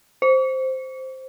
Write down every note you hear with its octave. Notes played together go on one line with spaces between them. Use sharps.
C5